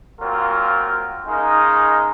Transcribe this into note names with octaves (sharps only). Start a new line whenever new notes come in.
A#2 F#3 C4 F4 A#4
C#3 G#3 D#4 A#4